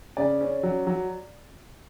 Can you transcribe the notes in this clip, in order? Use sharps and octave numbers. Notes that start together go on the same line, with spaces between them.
C#3 D5
C#4
F#3
F#3